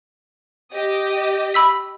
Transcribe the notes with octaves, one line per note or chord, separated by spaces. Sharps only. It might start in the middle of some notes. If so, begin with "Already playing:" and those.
G4 D#5
B5 E6 B6